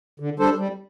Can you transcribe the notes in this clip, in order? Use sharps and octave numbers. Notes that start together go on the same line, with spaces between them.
D3
G3 D4 A4 C5
G3